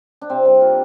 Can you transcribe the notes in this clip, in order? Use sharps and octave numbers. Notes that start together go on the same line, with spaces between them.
D4
C3 C4
G3 D4
A#3 F4